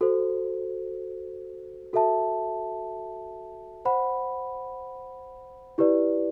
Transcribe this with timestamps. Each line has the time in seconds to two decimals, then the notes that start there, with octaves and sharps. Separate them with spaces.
0.01 F#4 A4 C5
1.93 F#4 A4 E5 A5
3.85 C5 F#5 B5
5.78 E4 G4 B4 D5